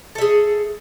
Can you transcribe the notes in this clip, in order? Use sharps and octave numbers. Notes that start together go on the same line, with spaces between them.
G#4 A4 E5